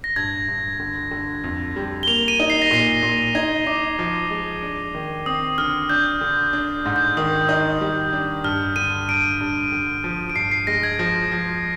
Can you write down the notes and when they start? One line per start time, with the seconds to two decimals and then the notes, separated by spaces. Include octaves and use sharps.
0.04 A#6
0.16 G2 G#6
0.48 G2
0.80 D3
1.11 D3
1.44 F2
1.76 G3
2.03 G7
2.07 A#3 F7
2.28 D#7
2.40 D#4
2.50 C7
2.62 A#6
2.71 A#2 C7
3.03 A#2
3.35 D#4 G#6
3.67 D#4 D6
3.99 F3
4.31 G#3
4.62 D4
4.95 D#3
5.26 C4 D#6
5.58 D3 F6
5.89 D4 G6
6.21 D3
6.53 D4
6.86 G#2
6.96 G6
7.17 D#3 D#6
7.49 D#4 D#6
7.81 G3
8.13 D4
8.44 G2 F6
8.76 D3 D#7
9.08 G2 D7
9.40 G2
9.72 D3
10.04 F3
10.30 D7
10.35 G2 C7
10.52 C7
10.67 G#3 A#6
10.83 G#6
10.99 F3
11.32 F3